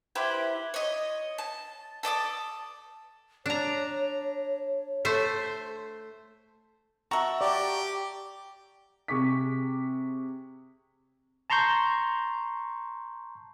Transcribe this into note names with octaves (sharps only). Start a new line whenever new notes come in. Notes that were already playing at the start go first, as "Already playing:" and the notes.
E4 G4 B4 C5
C#5 D#5
A5
A4 D5 D6 D#6
D4 C#5 A#5
A3 C5
F#4 E5 A5 A#5 C#6
G4 D5
C3 G#4 C#6 D6 B6
A5 A#5 C6 C#6 G6